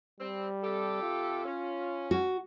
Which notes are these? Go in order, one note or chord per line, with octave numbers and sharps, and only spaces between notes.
G3 C4
C3 G4 A4
F4
C#4
F#4